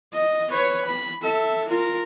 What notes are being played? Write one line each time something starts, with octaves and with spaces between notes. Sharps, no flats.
D#5
B4 C#5
B5
A4 E5
F4 A#4